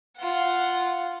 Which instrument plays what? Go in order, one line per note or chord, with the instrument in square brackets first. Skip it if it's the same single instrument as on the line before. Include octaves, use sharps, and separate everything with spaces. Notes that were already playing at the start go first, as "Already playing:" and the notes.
[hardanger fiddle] F4 F#5